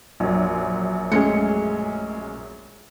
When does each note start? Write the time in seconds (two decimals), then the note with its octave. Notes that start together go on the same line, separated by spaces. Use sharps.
0.20 A#1 F#2
1.12 G#3 A3 C#4 G#4 C#7